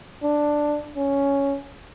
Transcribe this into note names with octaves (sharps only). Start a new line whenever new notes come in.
D4
C#4